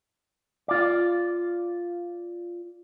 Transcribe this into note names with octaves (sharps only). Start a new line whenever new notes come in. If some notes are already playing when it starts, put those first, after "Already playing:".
F4 D5